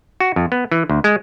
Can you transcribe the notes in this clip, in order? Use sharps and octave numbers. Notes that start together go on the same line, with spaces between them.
F#4
F2
B3
E3
D2
G#3